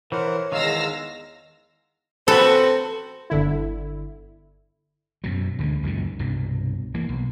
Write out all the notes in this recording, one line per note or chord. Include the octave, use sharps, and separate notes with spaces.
E3 A#4 C5 C#5 F#5
E2 D#3 G#3 F5 E6 A#6
C4 F#4 A4 B4 C5
G1 D3 E4
F#2 B2 F#3
D2 D3 G#3
C#2 F#2 A#2 D#3
C2 G2 B2
E3 A#3
B1